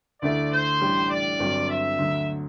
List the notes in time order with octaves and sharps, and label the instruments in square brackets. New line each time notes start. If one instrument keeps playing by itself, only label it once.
[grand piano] D2 D3 A3 E4 A4 [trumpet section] D5
[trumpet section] C5
[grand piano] A1 A2 G3 D4 G4
[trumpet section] D5
[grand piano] G1 G2 F#3 C4 F#4
[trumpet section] E5
[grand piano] D2 D3 F#3